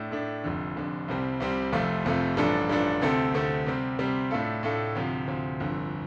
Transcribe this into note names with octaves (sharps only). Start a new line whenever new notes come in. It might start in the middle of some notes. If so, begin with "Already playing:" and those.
Already playing: A2 A3 D4
A2 A3 D4
F1 F2 D3
F1 F2 D3
C2 C3 G3 C4
C2 C3 G3 C4
F1 F2 C3 A3 F4
F1 F2 C3 A3 F4
A1 G2 F3 D4 A4
A1 G2 F3 D4 A4
D2 C3 A3 C4 A4
D2 C3 A3 C4 A4
C3 G3 C4
C3 G3 C4
A2 A3 D4 F4 A4
A2 A3 D4 F4 A4
D2 C3 F3
D2 C3 F3
G1 F2 D3